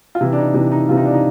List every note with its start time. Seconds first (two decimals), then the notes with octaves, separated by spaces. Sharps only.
0.15 F4
0.21 C3 E3 E4
0.32 D4
0.38 D#4
0.54 C3 E3 D4
0.72 D#4
0.89 C3 E3 F4
0.97 D#4
1.05 D4
1.13 D#4